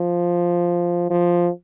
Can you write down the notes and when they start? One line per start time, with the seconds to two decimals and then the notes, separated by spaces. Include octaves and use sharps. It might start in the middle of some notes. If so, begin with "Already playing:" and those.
Already playing: F3
1.10 F3